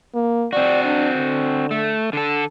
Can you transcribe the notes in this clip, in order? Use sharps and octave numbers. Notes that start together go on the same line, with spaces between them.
A#3
C4 F#4 D5
D4
D3
A3
D3 A4